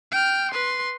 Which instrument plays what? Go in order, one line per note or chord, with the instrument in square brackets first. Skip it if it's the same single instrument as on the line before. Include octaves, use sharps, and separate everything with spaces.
[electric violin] G5 F6
B4 C6